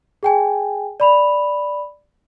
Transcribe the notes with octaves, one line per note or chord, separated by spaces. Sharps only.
G#4 G5 G#5
D5 B5 F7